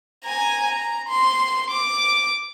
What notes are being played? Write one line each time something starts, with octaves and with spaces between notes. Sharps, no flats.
G#5 A#5
A#5
C6
D6